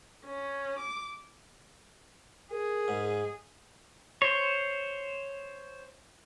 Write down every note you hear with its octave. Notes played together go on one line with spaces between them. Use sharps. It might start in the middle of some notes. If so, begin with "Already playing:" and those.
C#4
D6
G#4 A#4
G#2
C5 C#5